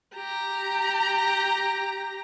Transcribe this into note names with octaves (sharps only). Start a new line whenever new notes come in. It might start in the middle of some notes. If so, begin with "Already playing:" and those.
G4 A#5